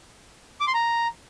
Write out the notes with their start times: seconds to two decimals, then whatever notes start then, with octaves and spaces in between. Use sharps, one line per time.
0.60 D6
0.67 C6
0.74 A#5